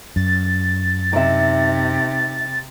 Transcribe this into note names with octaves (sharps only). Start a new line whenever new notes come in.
F#2 A6
C3 D#4 E5